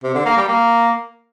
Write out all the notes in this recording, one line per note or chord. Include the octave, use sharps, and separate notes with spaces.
C3
D3
A#3
G3
A#3